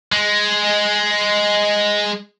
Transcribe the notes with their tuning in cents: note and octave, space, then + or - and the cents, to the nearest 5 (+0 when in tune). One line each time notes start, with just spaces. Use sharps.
G#3 +0